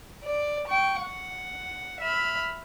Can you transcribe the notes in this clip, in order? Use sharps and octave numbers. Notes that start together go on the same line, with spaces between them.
D5
G5 C#6
F#5
E5 B5 F6